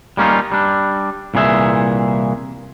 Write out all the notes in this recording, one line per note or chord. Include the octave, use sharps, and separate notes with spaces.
G3 A#3 C#4 D#4 F4
G3 D4
C2 A#2 E3 G#4 E5